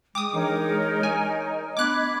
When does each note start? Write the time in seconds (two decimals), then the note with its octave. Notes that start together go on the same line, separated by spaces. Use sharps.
0.15 G#3 G5 D6 D#6
0.33 E3 D4 D#4 A#4 C#5
1.03 D#5 G#5
1.77 A3 B3 D4 B5 D6 F#6 G#6